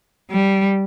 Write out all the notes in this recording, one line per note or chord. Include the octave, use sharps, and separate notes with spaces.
G3